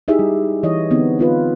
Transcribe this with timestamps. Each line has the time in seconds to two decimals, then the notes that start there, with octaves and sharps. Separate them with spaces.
0.08 D#4 E4 G4 G#4 E5
0.19 G3
0.63 E3 C#5 D#5
0.90 D3 E3 B3 C4 D#4
1.19 B3 F4 B4